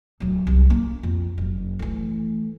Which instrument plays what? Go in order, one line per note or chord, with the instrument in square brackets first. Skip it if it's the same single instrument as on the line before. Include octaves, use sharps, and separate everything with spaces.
[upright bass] D1 F#3
C2
A#3
F2
F#1
E3 A3